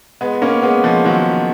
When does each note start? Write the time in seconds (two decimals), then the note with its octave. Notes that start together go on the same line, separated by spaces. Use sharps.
0.21 G#3 B3
0.42 A#3 C#4
0.63 G#3 B3
0.84 F3 G#3
1.05 D#3 F#3